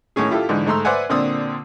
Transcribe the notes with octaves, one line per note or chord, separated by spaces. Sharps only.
A2 D#3 C#4 G#4
E4 F4 G4 A4
G#2 D3 E3
G#2 A3 A#5 C6 E6
B4 C5 D5 E5 F#5 G#5
A#2 D3 C4 D4 D#6 E6